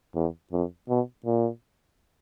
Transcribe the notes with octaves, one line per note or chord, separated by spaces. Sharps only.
E2
F2
B2
A#2